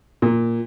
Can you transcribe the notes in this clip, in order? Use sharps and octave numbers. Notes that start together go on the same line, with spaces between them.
A#2